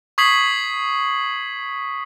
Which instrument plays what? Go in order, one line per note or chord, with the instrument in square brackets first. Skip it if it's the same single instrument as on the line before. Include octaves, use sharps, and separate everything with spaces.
[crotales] C#6 D#6 G#6 B6 C7 F#7